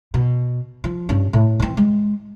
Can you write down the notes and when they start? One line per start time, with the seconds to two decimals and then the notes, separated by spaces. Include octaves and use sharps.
0.14 B2
0.84 F3
1.09 G2 C#4
1.33 A2
1.60 E3 C4
1.77 G#3